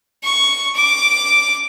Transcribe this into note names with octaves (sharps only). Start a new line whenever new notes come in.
C#6
D6